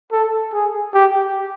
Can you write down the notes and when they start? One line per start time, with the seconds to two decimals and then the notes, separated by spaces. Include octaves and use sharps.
0.12 A4
0.53 G#4
0.94 G4